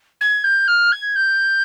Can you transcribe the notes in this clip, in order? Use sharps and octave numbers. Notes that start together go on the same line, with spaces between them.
G#6
G6
F6
G#6
G6